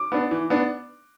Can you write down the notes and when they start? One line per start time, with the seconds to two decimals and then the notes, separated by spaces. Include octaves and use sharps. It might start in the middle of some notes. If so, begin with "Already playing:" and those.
Already playing: D6
0.12 B3 D4
0.31 E3
0.50 B3 D4